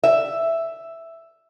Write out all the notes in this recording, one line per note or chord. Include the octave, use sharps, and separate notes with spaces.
E5